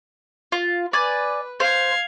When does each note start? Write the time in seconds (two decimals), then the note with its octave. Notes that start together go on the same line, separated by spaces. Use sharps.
0.52 F4
0.93 B4 D5 G#5
1.60 C5 F5 G#6